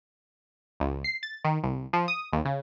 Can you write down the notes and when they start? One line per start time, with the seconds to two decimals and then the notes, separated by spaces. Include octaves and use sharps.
0.80 C#2
1.04 C7
1.23 A6
1.45 D#3
1.63 C2
1.93 F3
2.08 D#6
2.33 D#2
2.45 C#3